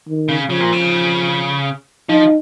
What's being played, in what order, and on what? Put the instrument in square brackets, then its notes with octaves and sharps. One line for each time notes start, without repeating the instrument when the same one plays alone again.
[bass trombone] D#3
[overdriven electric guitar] C#3
[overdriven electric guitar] C#3 [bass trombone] F3
[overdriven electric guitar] A#2
C#3
[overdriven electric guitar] F3 [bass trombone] D#4